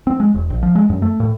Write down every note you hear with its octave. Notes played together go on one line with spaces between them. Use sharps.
C4
G#3
E1
A#1
F3
G#3
F#2
A3
A2